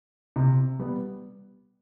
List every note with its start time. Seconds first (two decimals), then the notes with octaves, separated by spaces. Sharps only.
0.36 C3
0.79 G3 B3